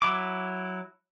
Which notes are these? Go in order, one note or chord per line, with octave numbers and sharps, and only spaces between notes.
F#3 E4 D6